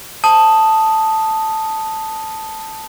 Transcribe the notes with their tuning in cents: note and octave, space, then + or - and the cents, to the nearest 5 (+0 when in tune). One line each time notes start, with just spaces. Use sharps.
A5 +0 D#6 +0